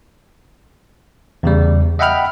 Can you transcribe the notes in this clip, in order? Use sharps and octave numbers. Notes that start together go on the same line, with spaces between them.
E2 C#3 G3
D#5 E5 F#5 G5 B5 F6